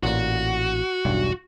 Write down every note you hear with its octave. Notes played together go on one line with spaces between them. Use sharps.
A1 A#2 F#4
E1 B1 G2